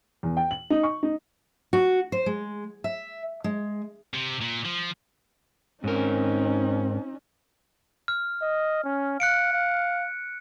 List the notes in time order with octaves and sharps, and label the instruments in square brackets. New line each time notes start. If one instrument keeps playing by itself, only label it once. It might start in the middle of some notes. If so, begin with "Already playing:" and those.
[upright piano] E2
G5
F#7
D#4
C#6
D#4
[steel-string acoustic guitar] F#4
C5
G#3
E5
G#3
[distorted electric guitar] C3
A#2
F3
[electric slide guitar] G#2 A#4 [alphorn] C4 [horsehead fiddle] C#4 D#4
[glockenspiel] F6
[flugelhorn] D#5
C#4
[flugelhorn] F5 [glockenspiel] F#6 C#7 D7
[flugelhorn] F5